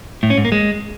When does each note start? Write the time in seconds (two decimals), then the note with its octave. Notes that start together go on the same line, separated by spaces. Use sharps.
0.23 A2
0.30 C#4
0.37 G#2
0.45 A#3
0.52 G#3